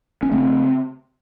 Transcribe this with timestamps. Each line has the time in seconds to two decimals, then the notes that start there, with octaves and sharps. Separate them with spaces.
0.23 C#4
0.32 C#3 A3 C4